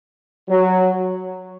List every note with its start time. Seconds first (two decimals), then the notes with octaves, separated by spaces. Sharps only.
0.49 F#3